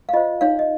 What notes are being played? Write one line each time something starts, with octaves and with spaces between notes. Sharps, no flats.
F5
F4 C5 D#5
D#4 C#5 F5
D#5